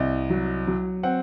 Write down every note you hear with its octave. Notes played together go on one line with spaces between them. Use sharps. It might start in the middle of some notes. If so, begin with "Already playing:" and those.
Already playing: C2 D#5
F#3
F#3
C4 F#5